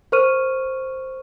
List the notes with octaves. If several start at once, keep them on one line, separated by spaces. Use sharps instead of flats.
A#4 C5 C#6 F6 D#7